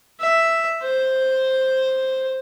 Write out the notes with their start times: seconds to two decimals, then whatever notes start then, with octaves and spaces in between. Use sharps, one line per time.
0.21 E5
0.83 C5